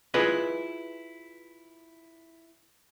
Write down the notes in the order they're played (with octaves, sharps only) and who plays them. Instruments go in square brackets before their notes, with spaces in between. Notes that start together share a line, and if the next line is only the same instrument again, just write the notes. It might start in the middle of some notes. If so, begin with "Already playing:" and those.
[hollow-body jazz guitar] E4 F4 G#4 B4 D#5